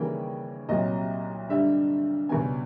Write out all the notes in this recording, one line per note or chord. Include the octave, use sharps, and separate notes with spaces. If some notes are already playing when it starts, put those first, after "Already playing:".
Already playing: D#2 C#3 E3 G3 A#3 G5
C2 A#2 F#3 D#5
G2 D3 G3 E5
C#2 B2 G3 B3 G#5